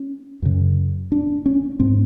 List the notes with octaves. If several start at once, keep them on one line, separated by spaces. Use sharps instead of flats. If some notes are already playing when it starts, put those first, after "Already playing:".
Already playing: C#4
F#2 C#3
D4
C#4
G#2 C4